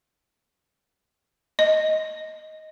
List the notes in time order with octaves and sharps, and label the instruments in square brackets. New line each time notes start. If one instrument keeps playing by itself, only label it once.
[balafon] D#5